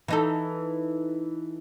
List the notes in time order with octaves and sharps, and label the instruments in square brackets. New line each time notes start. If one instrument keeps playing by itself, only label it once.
[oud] E3 D#4 A4